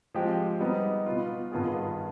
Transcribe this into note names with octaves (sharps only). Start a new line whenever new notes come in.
F3 G#3 C4 G4
G3 B3 D#4
B2 B3 F4
G2 D#3 B3 F4 G#4